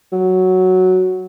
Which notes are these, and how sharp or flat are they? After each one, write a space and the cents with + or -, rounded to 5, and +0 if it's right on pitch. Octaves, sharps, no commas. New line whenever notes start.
F#3 +0